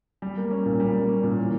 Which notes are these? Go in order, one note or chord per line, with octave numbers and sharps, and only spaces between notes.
G3
A#3
C#4
A#2
G3
A#3
C#4
A#2
E3